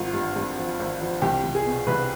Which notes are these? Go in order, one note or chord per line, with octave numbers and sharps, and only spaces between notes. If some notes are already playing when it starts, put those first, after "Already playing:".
Already playing: G#1 F4
G2
G2
F3
G#1
F3
C2 G4
C2
G#4
B2
C2 B4